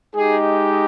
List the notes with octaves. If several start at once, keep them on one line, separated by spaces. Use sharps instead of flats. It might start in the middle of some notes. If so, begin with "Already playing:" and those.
G#3 D#4 G4 G#4